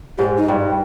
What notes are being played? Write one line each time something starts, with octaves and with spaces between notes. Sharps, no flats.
G#2 G4
D#4
G2